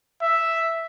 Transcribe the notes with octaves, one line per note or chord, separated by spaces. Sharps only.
E5